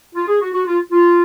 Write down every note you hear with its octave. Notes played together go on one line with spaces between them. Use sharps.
F4
G#4
F#4
F#4
F4
F4